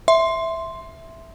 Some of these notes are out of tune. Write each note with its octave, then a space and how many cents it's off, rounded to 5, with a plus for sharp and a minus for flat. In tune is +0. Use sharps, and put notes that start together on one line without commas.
E5 +0 C6 +0